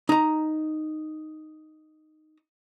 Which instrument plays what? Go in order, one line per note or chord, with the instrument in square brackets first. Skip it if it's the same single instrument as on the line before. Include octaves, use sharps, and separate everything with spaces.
[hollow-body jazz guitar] D#4 A#5